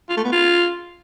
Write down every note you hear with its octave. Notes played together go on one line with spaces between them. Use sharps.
F4
A3
B3
F4